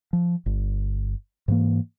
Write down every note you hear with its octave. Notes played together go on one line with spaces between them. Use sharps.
F3
G1
G#2 E3 A#3